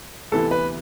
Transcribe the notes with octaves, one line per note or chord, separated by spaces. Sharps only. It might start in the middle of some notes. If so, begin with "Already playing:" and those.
D2 C3 E3 B3 E4 A4
B4